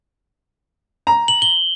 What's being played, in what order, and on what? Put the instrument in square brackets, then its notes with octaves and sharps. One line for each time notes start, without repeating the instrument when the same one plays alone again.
[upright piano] A#5
[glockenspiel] F#7
G7